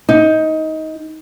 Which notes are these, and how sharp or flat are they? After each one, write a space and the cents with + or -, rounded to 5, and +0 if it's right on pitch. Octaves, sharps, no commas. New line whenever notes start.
D#4 +20